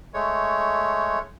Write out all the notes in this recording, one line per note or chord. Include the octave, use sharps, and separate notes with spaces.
G#3 A3 C#5